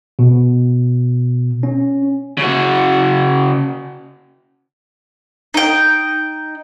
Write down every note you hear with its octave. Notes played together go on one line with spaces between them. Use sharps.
B2
C#4
C#3 F#4
D#4 G5